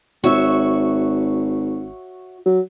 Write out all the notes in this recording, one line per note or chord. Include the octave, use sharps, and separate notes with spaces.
G#1 F#4 C#5 E5
F#3